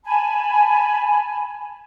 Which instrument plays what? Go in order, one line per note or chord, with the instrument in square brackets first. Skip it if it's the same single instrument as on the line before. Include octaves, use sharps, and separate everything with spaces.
[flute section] G#5 A5 B5